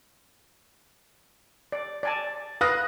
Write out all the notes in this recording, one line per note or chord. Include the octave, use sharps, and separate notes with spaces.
D5
D5 G#5 A5
B4 F5 D#6 F#6 A#6